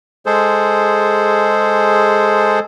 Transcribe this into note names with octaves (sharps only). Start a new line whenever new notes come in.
G#3 G#4 A4 C5